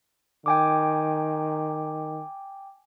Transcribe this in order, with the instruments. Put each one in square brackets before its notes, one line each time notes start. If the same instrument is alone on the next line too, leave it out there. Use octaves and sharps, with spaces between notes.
[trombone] D#3 [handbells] G5 G#5 D6